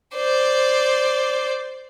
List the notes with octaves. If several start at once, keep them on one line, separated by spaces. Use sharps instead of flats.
C5 D5